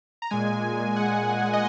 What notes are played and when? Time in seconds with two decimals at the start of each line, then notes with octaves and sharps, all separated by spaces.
0.22 A#5
0.31 A#2 G#3 G#5
0.96 F#5
1.53 D#5